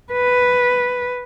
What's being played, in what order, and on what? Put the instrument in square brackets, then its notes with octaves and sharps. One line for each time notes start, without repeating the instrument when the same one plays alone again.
[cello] B4